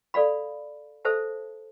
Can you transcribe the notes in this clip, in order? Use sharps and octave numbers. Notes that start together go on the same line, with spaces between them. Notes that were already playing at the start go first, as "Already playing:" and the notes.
A4 D5 F5 B5
A4 C5 E5 A5